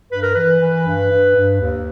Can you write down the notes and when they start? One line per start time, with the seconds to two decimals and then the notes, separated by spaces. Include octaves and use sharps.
0.11 G2 B4
0.22 A#4
0.34 E3 B4
0.61 E3
0.86 G2
1.11 G2
1.36 G2
1.60 D#2